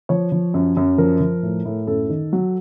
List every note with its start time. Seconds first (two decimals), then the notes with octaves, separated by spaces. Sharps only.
0.09 F3 C#5
0.32 F3
0.54 F#2
0.77 F#2
0.98 F3 A#4
1.20 F3
1.43 A2
1.65 A2
1.87 F#2 A4
2.09 D#3
2.33 F#3